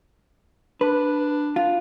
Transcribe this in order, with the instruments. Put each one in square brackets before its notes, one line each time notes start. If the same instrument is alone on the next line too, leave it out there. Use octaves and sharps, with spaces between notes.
[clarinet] D4 [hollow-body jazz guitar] B4
[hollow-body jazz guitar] F4